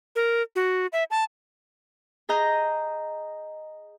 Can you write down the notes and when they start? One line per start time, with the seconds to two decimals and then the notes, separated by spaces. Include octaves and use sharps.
0.16 A#4
0.56 F#4
0.93 E5
1.11 A5
2.29 G#4 D#5 A#5 G6